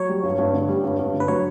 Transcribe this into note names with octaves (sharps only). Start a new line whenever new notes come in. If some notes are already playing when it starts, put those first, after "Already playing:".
Already playing: F#3 C#5
G3
G2
G2
D3
G3
G2
G2
D3
B4
F#3 C#5